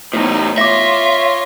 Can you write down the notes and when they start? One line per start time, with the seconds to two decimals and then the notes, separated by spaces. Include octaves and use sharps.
0.13 E2 A2 D#4
0.58 F4 C#5 E5 D6 A#6